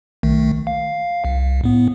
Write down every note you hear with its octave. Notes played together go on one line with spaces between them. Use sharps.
B1 D#3 A3
F5
C2
A2 B3